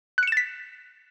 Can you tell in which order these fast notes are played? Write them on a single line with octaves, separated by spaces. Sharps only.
F#6 C#7 E7 A6 B6